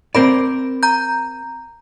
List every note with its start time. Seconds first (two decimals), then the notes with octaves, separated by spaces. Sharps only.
0.15 C4 A#4 D5 B5
0.83 A#5 G6